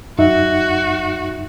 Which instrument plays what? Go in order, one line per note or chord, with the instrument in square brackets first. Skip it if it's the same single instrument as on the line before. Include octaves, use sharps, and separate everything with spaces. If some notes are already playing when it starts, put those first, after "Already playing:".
[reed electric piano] F#2 D#4 E5 [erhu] F#4